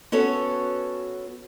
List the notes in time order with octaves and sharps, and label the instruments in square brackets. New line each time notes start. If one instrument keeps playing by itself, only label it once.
[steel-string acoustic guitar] B3 C#4 F#4 A4 C#5